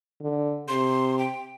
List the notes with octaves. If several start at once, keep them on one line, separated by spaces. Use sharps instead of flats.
D3
C3 C6
G5